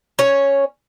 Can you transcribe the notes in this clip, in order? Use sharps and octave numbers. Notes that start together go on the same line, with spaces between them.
C#4 C#5